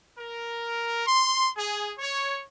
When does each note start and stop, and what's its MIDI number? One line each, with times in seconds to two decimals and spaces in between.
0.18 1.04 70
1.06 1.49 84
1.56 1.93 68
1.99 2.42 73